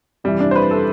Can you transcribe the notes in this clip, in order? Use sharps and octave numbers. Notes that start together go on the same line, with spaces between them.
F2 C3 E3 G3
D4
C5
B4
A4